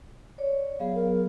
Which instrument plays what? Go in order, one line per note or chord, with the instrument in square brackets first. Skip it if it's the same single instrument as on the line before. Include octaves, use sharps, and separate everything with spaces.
[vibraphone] C#5 D5
[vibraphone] F#3 B3 G#4 [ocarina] F5
[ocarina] A#4